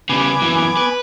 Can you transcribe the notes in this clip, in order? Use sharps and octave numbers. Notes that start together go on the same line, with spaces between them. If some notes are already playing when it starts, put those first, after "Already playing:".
C#3 G3 B3 G#5 D6
F#2 E3
B4